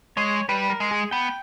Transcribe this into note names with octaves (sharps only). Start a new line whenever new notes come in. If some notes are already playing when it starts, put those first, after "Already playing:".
G#3 C#5
G3 B4
A#4
G#3
G#4
B3 G5